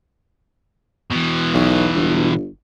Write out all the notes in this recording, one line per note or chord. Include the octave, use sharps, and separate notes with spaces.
B2 E3
B1
G1